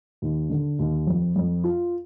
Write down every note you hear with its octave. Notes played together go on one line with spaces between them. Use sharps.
D#2
D3
D#2
F2
F2
F4